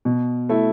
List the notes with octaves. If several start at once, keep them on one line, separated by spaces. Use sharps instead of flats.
B2
A3 E4